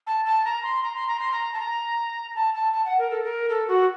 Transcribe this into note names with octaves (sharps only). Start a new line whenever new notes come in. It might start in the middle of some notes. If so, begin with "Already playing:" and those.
A5
A5
A#5
C6
A#5
C6
A#5
C6
A#5
A5
A#5
A5
A5
A5
F#5
A#4
A4
A#4
A4
F#4